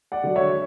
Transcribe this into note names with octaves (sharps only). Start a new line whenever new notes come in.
D5 F#5
D3 F#3
C#5 E5